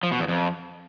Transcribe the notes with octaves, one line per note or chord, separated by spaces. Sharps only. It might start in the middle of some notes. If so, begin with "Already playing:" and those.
F3
B2
E2
F2